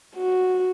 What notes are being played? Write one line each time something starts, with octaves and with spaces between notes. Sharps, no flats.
F#4